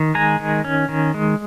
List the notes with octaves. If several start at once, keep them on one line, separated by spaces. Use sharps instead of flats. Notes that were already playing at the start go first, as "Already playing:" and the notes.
Already playing: D#3
G#3 G#5 A#5
D#3
C#4
D#3
G#3